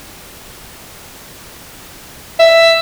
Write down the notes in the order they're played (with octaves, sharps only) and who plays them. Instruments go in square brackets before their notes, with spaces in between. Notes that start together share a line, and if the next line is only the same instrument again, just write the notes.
[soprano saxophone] E5